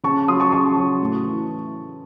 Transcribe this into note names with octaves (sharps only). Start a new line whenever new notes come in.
C#3 A5 C#6
F#3 C6 D#6
A5 C#6
C#3 A5 C#6
F#3
A2
E3